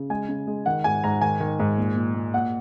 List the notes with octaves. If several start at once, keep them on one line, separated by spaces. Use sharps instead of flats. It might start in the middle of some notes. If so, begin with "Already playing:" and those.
Already playing: C#3
G#3 G#5
C#3
G#3
D#3 F#5
G#2 G#5
G#2 A#5
D#3 G#5
D#3
G#2
A#2
A#2
A#2
A#2 F#5